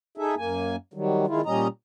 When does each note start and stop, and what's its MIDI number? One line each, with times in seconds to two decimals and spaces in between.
0.18 0.35 63
0.18 0.35 68
0.18 0.35 69
0.18 0.35 76
0.37 0.76 42
0.37 0.76 58
0.37 0.76 80
0.94 1.26 51
0.94 1.26 54
0.94 1.26 55
1.27 1.41 51
1.27 1.41 53
1.27 1.41 56
1.27 1.41 64
1.27 1.41 65
1.46 1.68 46
1.46 1.68 55
1.46 1.68 61
1.46 1.68 75
1.46 1.68 82